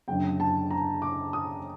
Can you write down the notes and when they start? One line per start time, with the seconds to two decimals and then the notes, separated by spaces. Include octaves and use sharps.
0.08 F#1 F#2 D3 G5
0.40 A5
0.71 A#5
1.02 D6
1.33 D#6